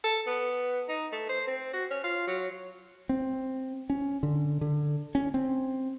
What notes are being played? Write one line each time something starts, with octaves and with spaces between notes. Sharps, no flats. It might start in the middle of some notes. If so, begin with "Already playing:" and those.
A4
B3
D#4
A3
C5
C4
F#4
C#4
F4
F#3
C4
C#4
D3
D3
C#4
C4